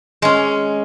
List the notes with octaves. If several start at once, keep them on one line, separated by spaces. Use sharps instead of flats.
G#3 C#4